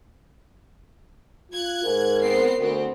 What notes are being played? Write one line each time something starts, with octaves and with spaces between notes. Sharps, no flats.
F4 F#6 G#6
G#2 A#4
B3 C4 C7
D2 B3 C4